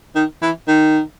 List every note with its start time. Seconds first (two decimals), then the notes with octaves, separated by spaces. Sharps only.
0.15 D#3
0.42 E3
0.68 D#3